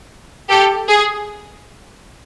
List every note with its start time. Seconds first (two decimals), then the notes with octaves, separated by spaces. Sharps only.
0.49 G4 A4
0.88 G#4